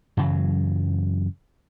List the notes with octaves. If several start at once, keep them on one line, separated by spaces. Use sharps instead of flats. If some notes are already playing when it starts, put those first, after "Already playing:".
F#2 C#3 E3 F#3